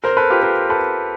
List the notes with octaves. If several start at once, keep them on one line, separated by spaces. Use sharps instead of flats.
A#4 C5
A4 B4
F4 G4
A#4 C5
A4 B4